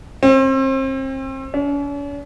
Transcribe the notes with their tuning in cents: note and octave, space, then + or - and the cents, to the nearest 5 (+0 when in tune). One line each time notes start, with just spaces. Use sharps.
C4 +35
C#4 +45